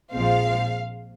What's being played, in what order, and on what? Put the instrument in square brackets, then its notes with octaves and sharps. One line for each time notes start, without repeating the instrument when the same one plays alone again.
[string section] A#1 A#2 F3 G#3 C4 F5